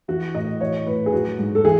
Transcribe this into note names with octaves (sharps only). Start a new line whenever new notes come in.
E3 F#4
A2 D#5
E3 C#5
A2 B4
G#4
F#3 F#4
G#2
A4
E3 G#4